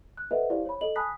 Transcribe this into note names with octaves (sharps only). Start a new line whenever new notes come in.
F#6
A4 B4 C5 D#5 E5 F#5
E4 G4 C5 D5 F5
C#5 B5
A4 D#5 F#7
G#5 A5 B5 D#6 F#6 B6